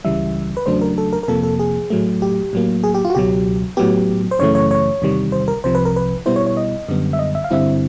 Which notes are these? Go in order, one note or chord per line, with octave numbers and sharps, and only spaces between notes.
C#2 C#3 E3 G3 E5
B4
E2 C#3 F#3 A3 D4 C5
A#4
A4
A#4
A#4
F2 C3 F3 A#3 A4
A4
G#4
A2 F#3 A3
G4
A2 F#3 A#3
G#4
G4
F4
F#4
C#2 B2 F#3 G4
A2 F#3 B3 G4
C5
F#2 C#3 E3 A3 C#5
C#5
C#5
E2 C3 D#3 G3
C5
A#4
C2 C3 F3 C5
B4
A#4
B4
B2 G3 B3 E4 C5
C#5
C#5
D#5
F#2 D3 G3 B3
E5
D#5
E5
F5
G2 D3 G3 C4 E4 E5